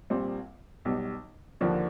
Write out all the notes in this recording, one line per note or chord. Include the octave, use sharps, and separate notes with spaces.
A#1 A#2 G3 C4
B1 B2 G3
D#2 D3 F3 A#3 D4